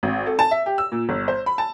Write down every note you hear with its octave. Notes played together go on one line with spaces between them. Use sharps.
G#1
A4
A5
E5
G4
E6
A#2
G1
C5
B5
A5